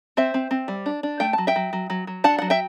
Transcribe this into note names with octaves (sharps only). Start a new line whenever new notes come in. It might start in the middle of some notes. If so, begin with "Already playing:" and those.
C4 C5 E5
C4
C4
G3
D4
D4
A3 G5
F#3 A5
E5 G5
F#3
F#3
F#3
F#3
D4 F#5 A5
F#3 F#5
E5 G5